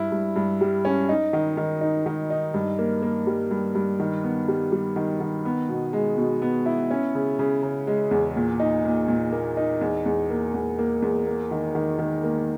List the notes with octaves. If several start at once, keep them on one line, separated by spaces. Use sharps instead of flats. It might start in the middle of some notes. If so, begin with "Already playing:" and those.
Already playing: G2 E4
G2
G2
G3
C#4
D#4
D#3
D#3
D#4
D#3
D#4
G2
A#3
A#3
G3
G2
G2
D#3
B3
G3
G3
D#3
D#3
B3
B2
G#3
B2
B3
E4
C#4
C#3
C#3
C#3
G#3
E2
A#2
D#4
A#2
A#2
A#3
D#4
E2
E2
A#3
E2
A#3
E2
A#3
D#3
D#3
D#3
A#3